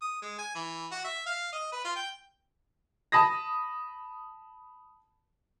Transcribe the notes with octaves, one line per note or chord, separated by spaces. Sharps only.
D#6
G#3
G#5
E3
F#4
E5
F5
D#5
B4
F4
G5
A5 B5 D#6 A#6